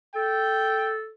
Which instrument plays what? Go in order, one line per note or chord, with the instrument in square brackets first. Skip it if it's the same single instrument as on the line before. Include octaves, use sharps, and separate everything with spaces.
[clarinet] A4 [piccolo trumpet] G5